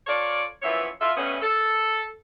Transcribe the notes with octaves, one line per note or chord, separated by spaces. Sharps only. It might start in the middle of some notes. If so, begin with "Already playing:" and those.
F4 A4 A#4 C#5 D5
F#2 E3 F3 B3 C#5 E5
F4 A4 E5
G2 B2 A3 B3 C#4
A4